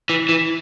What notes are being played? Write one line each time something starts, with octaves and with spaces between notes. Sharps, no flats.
E3
E3